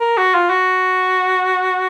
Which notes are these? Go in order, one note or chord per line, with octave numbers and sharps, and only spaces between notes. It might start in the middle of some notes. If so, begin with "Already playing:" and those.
A#4
F#4
F4
F#4